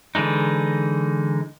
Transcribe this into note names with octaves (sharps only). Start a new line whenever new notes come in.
D3 E3 G#3 D#4